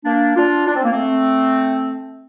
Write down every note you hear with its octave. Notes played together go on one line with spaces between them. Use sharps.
A#3 D4
D4 F4
D4
C4
A#3
A3 C4